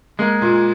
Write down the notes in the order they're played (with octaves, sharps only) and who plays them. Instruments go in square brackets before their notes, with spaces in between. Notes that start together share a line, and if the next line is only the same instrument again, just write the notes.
[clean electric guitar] G#3 [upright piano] A#3
[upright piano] A#2